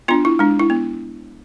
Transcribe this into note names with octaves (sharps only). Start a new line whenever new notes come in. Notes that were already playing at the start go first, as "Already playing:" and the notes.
B3 D4 F4
E4
G#3 D4
E4
B3